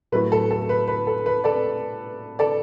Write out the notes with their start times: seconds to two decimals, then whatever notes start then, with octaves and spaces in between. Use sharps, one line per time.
0.12 A2 F#3 A3 B4
0.32 A4
0.51 A4
0.69 B4
0.88 B4
1.07 A4
1.26 B4
1.44 A4 D5
2.39 A4 D5